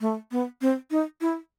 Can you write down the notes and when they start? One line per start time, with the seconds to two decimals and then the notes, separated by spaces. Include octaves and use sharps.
0.01 A3
0.31 B3
0.61 C4
0.91 D#4
1.21 E4